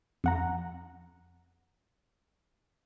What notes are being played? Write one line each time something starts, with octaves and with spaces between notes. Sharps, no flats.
F2 F#5 A#5